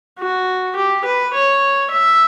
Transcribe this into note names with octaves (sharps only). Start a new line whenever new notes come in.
F#4
G4
B4
C#5
E5